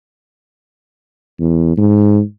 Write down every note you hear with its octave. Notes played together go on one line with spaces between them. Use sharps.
E2
G#2